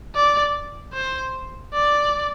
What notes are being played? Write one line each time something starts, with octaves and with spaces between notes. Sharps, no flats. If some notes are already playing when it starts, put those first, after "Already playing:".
D5
C5
D5